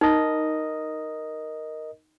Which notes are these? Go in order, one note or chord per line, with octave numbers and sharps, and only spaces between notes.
D#4 A#4 D#5